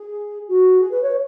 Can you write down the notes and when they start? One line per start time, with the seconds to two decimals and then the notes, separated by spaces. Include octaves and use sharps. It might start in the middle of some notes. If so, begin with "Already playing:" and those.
Already playing: G#4
0.48 F#4
0.80 G#4
0.91 B4
1.02 C#5